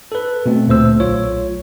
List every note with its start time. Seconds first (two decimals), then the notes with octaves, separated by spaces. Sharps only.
0.12 A4 B4
0.46 B2 A3 C4
0.67 D2 A#2 A3 C5 E6
1.00 B1 F4 C#5